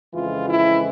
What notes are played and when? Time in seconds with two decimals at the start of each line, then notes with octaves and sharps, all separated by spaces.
0.14 F2 C#3 E3 G#3 F4
0.50 E4